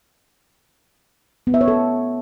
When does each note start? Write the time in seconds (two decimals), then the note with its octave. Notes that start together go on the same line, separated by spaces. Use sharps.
1.47 B3
1.54 E5
1.61 C#5
1.68 A4